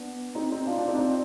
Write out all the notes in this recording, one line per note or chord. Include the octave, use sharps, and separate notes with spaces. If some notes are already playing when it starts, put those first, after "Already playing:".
Already playing: B3 D4
C4 D#4
C4 D#4
D4 F4
D4 F4
C4 D#4
D4
C4